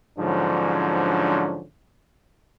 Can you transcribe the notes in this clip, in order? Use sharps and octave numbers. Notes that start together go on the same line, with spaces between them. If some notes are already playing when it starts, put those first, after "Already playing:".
G#2 D3 F3 F#3 C#4 D4